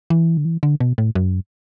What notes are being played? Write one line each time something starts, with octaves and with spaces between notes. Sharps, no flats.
E3
D3
E3
D3
B2
A2
F#2